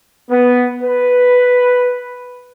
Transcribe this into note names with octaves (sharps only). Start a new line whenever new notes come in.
B3
B4